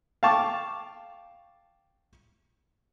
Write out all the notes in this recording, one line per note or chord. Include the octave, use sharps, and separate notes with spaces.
F5 G5 A5 C#6 D6